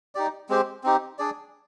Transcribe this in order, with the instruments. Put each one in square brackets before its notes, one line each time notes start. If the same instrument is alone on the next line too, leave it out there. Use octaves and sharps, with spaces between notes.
[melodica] D#4 G4 D5
G#3 C4 G4 C5
C4 D#4 G4
D4 G#4 D5